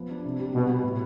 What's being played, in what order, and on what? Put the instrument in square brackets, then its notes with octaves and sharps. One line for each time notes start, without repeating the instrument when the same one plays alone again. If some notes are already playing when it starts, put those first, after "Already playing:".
Already playing: [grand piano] F3 B3
D4
C3
G3
[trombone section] B2 [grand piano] G3
[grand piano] B3
A2